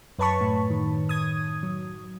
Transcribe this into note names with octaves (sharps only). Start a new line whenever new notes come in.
F#2 B4 C#5 A5 B5 C#6
A2
D#3
D#6 G#6
F#3